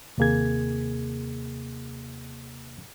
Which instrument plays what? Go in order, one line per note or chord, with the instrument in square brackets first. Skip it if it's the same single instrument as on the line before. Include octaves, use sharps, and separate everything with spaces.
[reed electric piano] D#2 C3 A#3 G#4 G#6